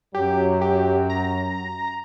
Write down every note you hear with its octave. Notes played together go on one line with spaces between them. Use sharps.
F#2 F#3 G4
G4
A#5